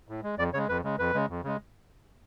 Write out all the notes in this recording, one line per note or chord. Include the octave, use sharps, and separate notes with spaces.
A2
G#3
F2 D5
C#3 G#3 C#5
F2 B4
C#3 G#3
F2 B4
C#3 G#3
F2
C#3 G#3